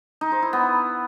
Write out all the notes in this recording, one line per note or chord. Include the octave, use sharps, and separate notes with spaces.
D#4
C5
E4
B3